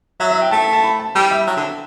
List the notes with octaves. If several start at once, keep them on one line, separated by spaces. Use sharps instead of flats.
F#3 E5
E5
G5
A3 A5
A5
B5
A5
G3 G5
E5
F#3
D3